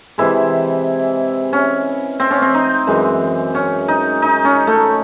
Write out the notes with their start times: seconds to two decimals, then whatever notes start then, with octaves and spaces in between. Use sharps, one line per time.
0.18 C3 E3 G#3 E4
1.53 C#4
2.20 C4
2.31 C#4
2.42 C4
2.54 D#4
2.87 F#2 E3 G#3
3.55 C#4
3.88 D#4
4.22 D#4
4.45 C#4
4.67 A3